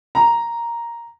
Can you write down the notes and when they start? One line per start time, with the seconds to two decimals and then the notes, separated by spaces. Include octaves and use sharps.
0.15 A#5